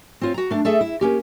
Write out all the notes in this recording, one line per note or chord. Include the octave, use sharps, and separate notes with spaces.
C4 F4 C#5
F#4 A#5
A3 D4
A3 G#4 A4 E5
E4
A#3 C#4 G4